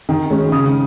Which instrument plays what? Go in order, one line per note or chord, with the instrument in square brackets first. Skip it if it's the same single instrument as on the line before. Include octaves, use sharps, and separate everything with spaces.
[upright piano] D#3
G#3 C#4
C#3 D#6